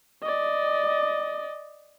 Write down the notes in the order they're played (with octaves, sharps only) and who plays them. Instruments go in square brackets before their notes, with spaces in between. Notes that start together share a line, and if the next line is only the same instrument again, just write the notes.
[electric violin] D5 D#5